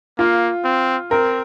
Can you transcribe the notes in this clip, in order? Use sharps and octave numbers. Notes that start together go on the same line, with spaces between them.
A#3 F4
C4
C4 A#4